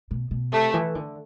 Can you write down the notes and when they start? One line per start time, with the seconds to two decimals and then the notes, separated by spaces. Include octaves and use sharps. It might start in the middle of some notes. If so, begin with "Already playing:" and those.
0.11 B2
0.31 B2
0.52 C3 A3
0.74 E3
0.95 D3